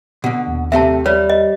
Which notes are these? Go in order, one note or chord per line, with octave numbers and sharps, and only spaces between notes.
B2 D3
D#1 D#2
C3 A3 C4 E5 A5
G3 C#5 D5
D#5